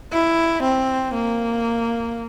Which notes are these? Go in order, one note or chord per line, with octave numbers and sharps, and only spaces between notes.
E4
C4
A#3